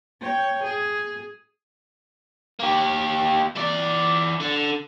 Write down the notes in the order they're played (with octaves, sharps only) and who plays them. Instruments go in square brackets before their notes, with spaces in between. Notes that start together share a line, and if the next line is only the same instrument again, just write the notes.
[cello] C#5 G5
G#4
[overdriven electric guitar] A#3 G4
E3 D5
D3